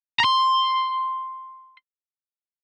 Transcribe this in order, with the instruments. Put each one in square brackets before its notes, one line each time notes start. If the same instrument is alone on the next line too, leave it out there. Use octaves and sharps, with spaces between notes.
[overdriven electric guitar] A#5 C6